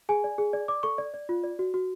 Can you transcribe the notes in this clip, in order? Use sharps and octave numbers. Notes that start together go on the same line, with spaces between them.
G#4 G#5
D5
G#4
D5
D5 D6
A4 C#6
D5
D5
F4
D5
F#4
F#4